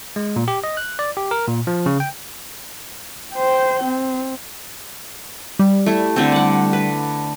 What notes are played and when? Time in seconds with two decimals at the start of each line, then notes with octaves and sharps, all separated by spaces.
0.16 G#3
0.36 A#2
0.48 G4
0.64 D#5
0.77 F#6
0.99 D5
1.17 G4
1.31 A#4
1.47 A#2
1.67 F3
1.86 C#3
2.00 G5
3.34 C5 G5
3.84 C4
5.59 G3
5.86 A3 E4
6.16 D3 A3 C4
6.32 D5 F#5
6.73 B4